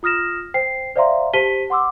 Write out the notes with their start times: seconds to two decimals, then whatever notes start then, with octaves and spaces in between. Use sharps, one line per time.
0.03 F4 D#6 F6 A#6 E7
0.54 C5 G5 C7
0.96 C5 D5 E5 F5 A#5 C6
1.33 G4 C5 A5 B6 D#7 G7
1.70 F#5 C6 D6 E6